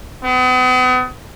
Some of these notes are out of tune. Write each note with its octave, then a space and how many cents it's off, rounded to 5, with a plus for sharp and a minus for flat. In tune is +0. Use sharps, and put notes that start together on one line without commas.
B3 +40